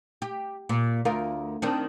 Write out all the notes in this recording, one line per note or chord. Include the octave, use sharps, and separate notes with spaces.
G4
A#2
D2 F4 A#4
D#3 C4 D4